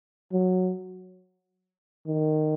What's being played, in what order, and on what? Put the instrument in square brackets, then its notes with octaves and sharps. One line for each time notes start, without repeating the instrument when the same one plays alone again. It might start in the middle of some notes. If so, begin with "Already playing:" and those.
[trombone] F#3
D#3